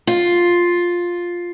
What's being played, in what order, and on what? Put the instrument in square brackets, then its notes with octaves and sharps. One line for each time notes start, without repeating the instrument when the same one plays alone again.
[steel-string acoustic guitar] F4